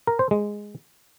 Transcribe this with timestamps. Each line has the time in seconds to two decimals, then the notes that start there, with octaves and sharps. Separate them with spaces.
0.07 A#4
0.19 C5
0.31 G#3